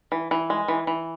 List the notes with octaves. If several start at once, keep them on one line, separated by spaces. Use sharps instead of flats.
E3
E3
G#3
E3
E3